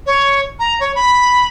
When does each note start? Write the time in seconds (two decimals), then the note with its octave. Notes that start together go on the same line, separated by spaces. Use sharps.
0.06 C#5
0.59 A#5
0.80 C#5
0.95 B5